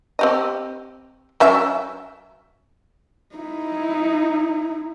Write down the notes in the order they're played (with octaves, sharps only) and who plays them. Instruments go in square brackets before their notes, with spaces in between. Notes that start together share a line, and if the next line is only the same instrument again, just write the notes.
[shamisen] C4 G4 D#5
F#3 C#4 E5
[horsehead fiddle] D#4 E4